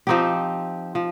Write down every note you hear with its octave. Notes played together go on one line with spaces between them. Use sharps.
F3 C4 D#4 G4
F3